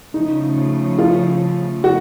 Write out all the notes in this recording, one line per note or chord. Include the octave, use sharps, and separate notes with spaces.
C#3 F3 A3 D#4
F4
F#4